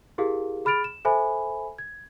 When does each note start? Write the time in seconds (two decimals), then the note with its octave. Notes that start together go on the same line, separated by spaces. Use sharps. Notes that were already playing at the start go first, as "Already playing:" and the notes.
0.18 E4 G4 G#4 A#4 F5
0.65 G#4 B5 F6 A6 D7 F7
0.84 E7
1.05 A4 C5 E5 G#5 B5
1.78 G#6